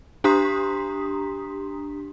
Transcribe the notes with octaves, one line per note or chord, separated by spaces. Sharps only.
D4 G4 A#5 C6 D#6 B6